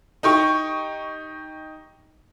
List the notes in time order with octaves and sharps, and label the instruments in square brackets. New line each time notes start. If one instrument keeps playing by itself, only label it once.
[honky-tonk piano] D#4 G4 C#6